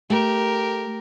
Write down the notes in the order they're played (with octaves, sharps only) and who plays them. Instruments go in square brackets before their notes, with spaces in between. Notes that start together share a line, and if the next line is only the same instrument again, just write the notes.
[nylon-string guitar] A3 [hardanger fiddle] G4 A#4